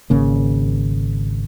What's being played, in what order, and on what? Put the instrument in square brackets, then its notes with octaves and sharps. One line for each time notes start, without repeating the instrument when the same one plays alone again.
[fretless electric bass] G#1 C#3 A#3